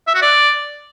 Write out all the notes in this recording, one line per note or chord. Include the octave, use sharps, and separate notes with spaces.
E5
F#4
D5